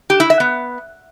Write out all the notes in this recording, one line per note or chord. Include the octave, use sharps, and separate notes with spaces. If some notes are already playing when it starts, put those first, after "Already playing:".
G4
E4
E5
B3